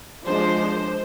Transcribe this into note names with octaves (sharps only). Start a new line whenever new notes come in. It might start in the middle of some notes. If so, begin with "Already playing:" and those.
F3 G#3 D4 C5